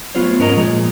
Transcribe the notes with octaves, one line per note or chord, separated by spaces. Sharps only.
F#3 A3 B3 F4 C5 C#5
G#2 C#4 A#4 C#5 D#5 A#5
A#2 F3 G#3